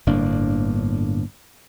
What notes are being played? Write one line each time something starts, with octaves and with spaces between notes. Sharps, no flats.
G1 A2 A#3 D4